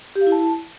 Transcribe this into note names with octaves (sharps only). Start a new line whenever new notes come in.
G4
F5
E4
A5